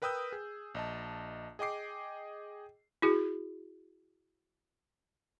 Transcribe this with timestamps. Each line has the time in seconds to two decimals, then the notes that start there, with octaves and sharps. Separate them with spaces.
0.02 A#4 B4 G5 D#6 E6 G6
0.32 G#4
0.75 A#1 D#5 A5
1.59 G#4 D#5 G5 D6 C7
3.02 E4 F#4 G#4